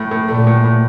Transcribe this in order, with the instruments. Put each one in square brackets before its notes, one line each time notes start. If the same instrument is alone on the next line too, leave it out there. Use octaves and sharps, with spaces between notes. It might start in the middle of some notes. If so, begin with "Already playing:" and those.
Already playing: [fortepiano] A2 A3
A2
[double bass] A#2 [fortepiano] A3
[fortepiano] A2
A2